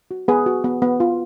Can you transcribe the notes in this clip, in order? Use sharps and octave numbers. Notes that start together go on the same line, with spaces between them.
F#4
B3 G#4 B4
F#4
B3
B3
F4